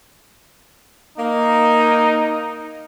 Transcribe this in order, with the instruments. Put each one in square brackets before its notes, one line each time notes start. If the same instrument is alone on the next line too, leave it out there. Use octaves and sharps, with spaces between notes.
[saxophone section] A#3 [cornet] D#4